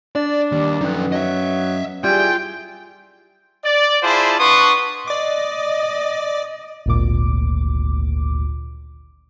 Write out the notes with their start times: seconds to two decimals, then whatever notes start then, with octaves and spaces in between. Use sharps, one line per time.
0.16 D4 D5
0.52 D#2 G3
0.81 F#2 F3 B3 D#4
1.12 F#3 D#5 E5
2.04 G3 E4 F4 G#4 G5
3.64 D5
4.02 E4 F4 G#4 C5 D5 A5
4.38 D4 B4 F#5 C6 C#6 D#6
5.08 D5 D#5 D6
6.86 G#1 D2 A#2 D6